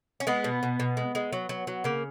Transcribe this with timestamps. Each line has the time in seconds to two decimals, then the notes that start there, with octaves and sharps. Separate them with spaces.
0.20 C#4
0.27 G#3 B3
0.44 B2
0.63 B2
0.80 B2
0.97 G#3
1.15 G#3
1.32 F#3
1.49 F#3
1.67 F#3
1.84 C#3 A#3